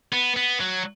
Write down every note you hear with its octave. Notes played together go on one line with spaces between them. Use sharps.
B3
B3
F#3